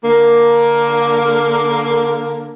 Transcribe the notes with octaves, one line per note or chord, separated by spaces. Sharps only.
D3 A#3